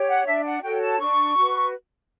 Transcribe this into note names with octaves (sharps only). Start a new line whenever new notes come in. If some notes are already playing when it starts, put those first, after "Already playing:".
Already playing: G4 C#5
F#5
D4 E5
F#5
F#4 A4 C#5 G5
A5
D4 C#6
F#4 B4